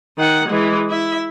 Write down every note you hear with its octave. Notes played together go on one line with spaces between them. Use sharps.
D#3 F#5
E3 G#3
E4 E5